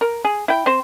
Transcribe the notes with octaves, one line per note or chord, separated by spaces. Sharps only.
A#4
G#4
E4 G5
C4 C5